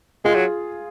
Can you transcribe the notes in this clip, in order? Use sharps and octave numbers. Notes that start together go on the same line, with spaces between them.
G#3 F4 G#4
F#3